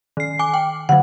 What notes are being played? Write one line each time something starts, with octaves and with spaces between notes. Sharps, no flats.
D#3 C7
G#5 D6
G5
D3 F#3 F#5